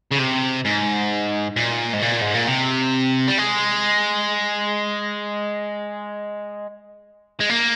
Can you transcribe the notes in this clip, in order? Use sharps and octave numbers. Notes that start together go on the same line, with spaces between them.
C#3
C3
G#2
A#2
G#2
A#2
G#2
A#2
C3
G3
G#3
G#3
A#3